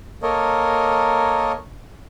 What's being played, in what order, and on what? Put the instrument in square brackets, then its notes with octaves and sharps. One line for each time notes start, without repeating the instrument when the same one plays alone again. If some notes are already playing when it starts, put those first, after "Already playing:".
[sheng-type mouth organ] A#3 A4 A#4 C#5 D#5